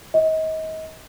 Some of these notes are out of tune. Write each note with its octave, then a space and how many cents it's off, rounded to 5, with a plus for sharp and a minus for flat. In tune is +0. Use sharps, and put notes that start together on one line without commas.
D#5 +35